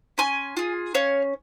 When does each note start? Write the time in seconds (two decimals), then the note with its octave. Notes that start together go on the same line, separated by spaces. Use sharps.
0.18 C#4 G#5 C6
0.57 F4 G#4
0.94 C#4 C#5 F5